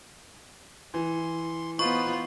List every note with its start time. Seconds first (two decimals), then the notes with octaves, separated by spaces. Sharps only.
0.94 E3 C6
1.79 B3 D#4 F4 B4 C5 C#6